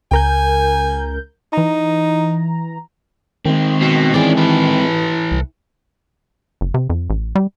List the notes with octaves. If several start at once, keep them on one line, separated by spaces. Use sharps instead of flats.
C#2 A#4 G#5 G6
E3 D#4 A#5
D#3 G#3 C4
B2
E3 C#4 G#4 D5
A4 B4
C2
F#1
C3
F2
A1
G3